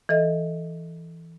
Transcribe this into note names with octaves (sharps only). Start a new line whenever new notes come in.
E3 A4 D#5